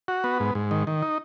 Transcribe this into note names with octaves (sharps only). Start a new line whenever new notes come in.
F#4
B3
G#2
G#2
D#3
D#3
D#4